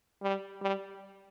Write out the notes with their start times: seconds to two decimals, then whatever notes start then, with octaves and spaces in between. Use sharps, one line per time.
0.22 G3
0.61 G3